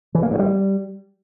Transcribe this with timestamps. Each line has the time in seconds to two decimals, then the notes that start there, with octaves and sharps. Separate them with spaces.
0.15 E3
0.23 A#3
0.31 G2
0.39 G3